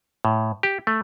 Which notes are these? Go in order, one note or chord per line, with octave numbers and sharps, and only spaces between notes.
A2
G4
A3